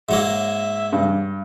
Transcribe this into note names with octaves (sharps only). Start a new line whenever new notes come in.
G#2 F#3 A#3 E5
G2